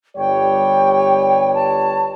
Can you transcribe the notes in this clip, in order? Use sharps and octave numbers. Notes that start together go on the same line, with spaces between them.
G1 G3 C#5 G5
A5